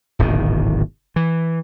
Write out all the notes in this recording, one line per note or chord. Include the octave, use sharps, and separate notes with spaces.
D1 G#1 B2 D#3
E3